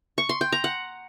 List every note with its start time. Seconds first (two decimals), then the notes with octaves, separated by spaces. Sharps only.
0.18 C#6
0.29 C6
0.41 G5
0.52 A#5
0.64 F#5